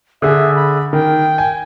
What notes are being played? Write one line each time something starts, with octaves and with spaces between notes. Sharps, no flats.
D3 G#4 E5
B5
D#3 G5
G#5